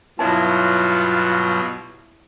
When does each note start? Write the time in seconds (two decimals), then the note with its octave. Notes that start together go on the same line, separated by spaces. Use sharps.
0.19 G2 B2 F#3 E4 F4 C#5 A5